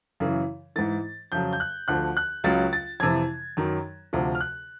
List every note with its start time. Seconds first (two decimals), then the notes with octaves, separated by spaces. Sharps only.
0.20 F#2 C#3 E3
0.76 G#2 E3 A6
1.32 F2 C#3 F#3 G6
1.53 G6
1.60 F#6
1.88 D2 D3 F3 F#6
2.17 F#6
2.44 C#2 C#3 F#3 A6
2.73 A6
3.00 F2 C3 E3 G#6
3.57 F#2 D#3 F#3
4.13 D2 C3 F3
4.35 F6
4.41 F#6